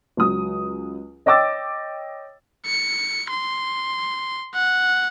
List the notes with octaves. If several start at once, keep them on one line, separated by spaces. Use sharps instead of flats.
C#2 F#3 D#6
C#5 D#5 G5 D6 E6 A6
C#7
C6
F#5